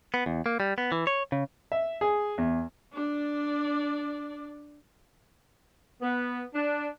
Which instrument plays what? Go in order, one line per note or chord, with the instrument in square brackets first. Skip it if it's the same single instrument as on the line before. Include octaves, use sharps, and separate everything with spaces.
[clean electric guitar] B3
E2
A#3
G3
B3
E3
C#5
C#3
[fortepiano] E5
G#4
E2
[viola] D4 D5
[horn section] B3
D4